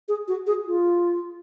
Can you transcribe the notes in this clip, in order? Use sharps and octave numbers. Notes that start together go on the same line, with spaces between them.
G#4
F#4
G#4
F4